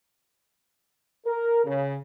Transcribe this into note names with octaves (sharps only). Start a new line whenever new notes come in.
A#4
C#3